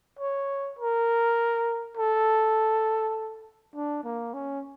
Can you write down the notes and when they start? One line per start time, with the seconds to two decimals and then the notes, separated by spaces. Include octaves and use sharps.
0.19 C#5
0.79 A#4
1.97 A4
3.75 D4
4.04 A#3
4.34 C#4